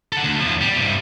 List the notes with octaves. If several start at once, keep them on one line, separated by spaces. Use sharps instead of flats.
A4 F#5
D2
E2 F3
G3
G2 C3